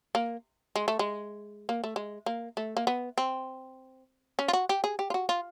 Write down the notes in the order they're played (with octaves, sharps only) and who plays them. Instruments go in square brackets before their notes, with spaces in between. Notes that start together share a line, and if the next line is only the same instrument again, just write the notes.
[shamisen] A#3
G#3
A3
G#3
A#3
A3
G#3
A#3
A3
A#3
B3
C4
C#4
F4
F#4
G4
G#4
G4
F4
F#4
F4